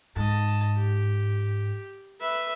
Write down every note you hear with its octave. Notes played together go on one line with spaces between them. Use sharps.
G#2 D#5 A5
G4
B4 E5